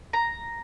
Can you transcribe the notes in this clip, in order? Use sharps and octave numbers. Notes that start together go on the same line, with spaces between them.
A#5